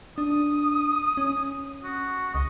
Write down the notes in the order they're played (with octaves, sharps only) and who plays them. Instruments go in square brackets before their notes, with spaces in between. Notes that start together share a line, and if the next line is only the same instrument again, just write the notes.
[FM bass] D4 [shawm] D#6
[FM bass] C#4
[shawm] F#4
[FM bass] C#2 [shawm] D#5